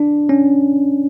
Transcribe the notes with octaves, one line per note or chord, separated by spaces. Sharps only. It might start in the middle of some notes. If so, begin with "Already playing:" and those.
Already playing: D4
C#4